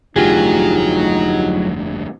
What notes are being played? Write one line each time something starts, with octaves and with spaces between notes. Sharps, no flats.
F1 D2 G2 F#3 D#4 F4 G4 G#4